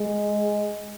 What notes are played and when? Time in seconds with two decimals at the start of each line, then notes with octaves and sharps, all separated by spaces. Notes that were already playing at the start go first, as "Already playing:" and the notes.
Already playing: G#3